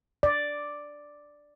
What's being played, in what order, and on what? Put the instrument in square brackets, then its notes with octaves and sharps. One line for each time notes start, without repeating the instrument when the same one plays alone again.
[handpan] D5